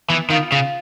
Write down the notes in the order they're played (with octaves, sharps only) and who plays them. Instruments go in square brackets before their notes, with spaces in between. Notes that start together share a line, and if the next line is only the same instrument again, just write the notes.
[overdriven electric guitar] E3 [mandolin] B3
[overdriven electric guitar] D#3 [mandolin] F4
[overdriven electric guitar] C#3 [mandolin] F4